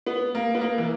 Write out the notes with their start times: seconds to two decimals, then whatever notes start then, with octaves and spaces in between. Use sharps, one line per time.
0.07 B3
0.35 A#3
0.55 B3
0.61 A#3
0.78 E3